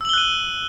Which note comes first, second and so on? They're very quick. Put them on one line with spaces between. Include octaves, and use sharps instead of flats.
E6 F#7 G7 F#6 D#7